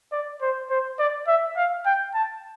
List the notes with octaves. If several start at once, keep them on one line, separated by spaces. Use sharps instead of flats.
D5
C5
C5
D5
E5
F5
G5
A5